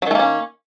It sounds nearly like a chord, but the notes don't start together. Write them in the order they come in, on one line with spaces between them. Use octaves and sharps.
F#3 D#3 A3 A#3 C#4